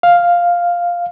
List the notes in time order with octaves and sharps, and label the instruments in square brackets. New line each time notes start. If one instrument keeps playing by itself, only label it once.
[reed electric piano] F5